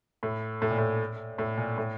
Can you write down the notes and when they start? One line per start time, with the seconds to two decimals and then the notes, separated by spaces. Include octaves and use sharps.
0.23 A2
0.62 A2
0.71 A#2
0.78 A2
1.38 A2
1.57 A#2
1.78 A2